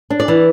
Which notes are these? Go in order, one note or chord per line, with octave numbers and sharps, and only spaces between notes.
D4
D5
E3